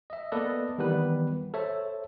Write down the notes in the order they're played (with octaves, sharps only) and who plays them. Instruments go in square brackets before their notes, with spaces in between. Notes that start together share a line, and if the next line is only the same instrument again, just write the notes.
[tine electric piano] D#5 E5
A#3 B3 A4 B4 D5 D#5
D#3 E3 G3 B3 B4
A4 C5 C#5 E5